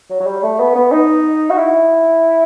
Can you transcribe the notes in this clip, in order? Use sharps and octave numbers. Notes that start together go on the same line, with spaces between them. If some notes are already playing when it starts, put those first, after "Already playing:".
F#3
F#3
G3
A3
B3
B3
D#4
F#4
E4